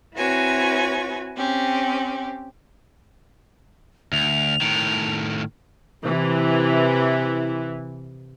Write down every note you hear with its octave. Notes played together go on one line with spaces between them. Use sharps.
C4 E4 F#4 B4 C#5 G#5
C4 C#4 G4
D2 F7
A2 D#3
C3 E3